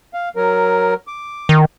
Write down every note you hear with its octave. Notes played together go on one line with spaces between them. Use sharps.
F5
F#3 A#4
D6
D#3